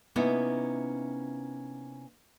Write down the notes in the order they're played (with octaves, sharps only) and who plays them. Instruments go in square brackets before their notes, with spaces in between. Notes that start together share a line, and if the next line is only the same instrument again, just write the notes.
[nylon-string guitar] C3 A#3 B3 C#4 D#4 E4